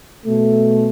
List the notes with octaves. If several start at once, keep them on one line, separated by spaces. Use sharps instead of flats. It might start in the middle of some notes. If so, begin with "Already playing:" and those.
B2 A3